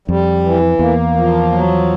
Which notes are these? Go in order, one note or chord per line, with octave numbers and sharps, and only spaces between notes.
F2 G3
E3
E2 A#3
F3
F#3